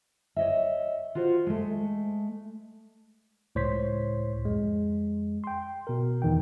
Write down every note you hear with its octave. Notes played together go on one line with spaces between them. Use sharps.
C#5 D#5 E5
F4 F#4 C5
G#3 A3
C#2 A2 C5 C#5 C6 B6
F2 G#3
G5 C6
B2 A#4
E2 D#3 E3 G5